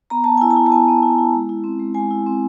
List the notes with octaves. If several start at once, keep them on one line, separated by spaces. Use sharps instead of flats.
B3 A#5
B3 A5
E4 G#5
A5
E4
A5
B3 G#5
B3
E4
E4
G#3
E4
C4
G#3
G#3 G#5
E4
C4